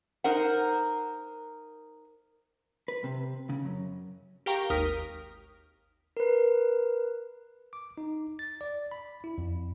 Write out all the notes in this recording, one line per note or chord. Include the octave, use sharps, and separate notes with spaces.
D#4 A#4 C5 F#5
B4
C3
C#3
F#2
G4 A#4 F5 G5 A#5 C#6
G#1 D#2 A#4 D#6 F6 B6
A#4 B4
D6
D#4
A6
D5
B5
E4
F2